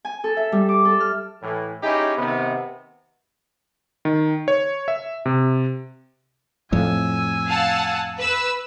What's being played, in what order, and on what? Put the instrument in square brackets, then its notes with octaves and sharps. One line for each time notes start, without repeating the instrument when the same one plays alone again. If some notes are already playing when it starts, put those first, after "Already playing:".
[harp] G#5
A4
E5
G3
D6
A4
F6
[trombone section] A2 E3
C#4 D#4 E4 G4 G#4
C3 D#3 B3
[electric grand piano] D#3
C#5
E5
C3
[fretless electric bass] F2 A2 [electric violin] G#5 E6
[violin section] F5 F#5 A5
B4 E6